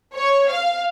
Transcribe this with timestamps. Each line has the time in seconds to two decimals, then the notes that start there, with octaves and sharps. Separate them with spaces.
0.15 C#5
0.50 F5